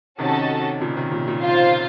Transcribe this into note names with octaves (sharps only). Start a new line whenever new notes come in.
C3 D#3 C#4 F#4 A4 D#5 A5
A#2 C#3
C3 D#3
A#2 C#3
A#2
F4 C5 F5